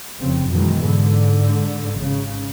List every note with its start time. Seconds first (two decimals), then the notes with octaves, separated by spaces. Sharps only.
0.20 F1 C#3 C4
0.50 F#2 B2 D#3 E3 G#3
0.80 G#2 D3
1.97 G#1 C#3